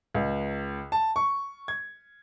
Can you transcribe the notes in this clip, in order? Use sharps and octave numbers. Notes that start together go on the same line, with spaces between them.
C#2
A5
C#6
G#6